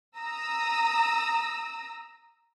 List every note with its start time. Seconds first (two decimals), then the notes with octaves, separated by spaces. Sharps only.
0.18 A#5 D#6 E6